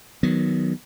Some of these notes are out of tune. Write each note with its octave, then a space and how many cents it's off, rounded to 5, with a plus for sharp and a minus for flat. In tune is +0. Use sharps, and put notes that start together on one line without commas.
D#3 +5 F#3 +0 B3 +0